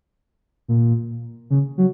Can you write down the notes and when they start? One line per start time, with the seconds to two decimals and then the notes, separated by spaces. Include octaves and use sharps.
0.68 A#2
1.50 C#3
1.78 F#3